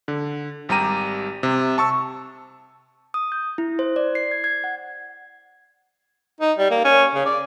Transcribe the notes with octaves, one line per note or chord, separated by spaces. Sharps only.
D3
G#1 G3 G4 A#5 D#7
C3
A5 C#6 E6
D#6
G6
E4
C5
D5
C7
G#6
G#6
F#5
D#4
G3
A#3
C#4
C#3
D5